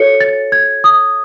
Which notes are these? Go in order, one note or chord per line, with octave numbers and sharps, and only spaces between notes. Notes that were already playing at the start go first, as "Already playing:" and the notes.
Already playing: F#4 A4 C#5 C#7
A6
G#6
D#6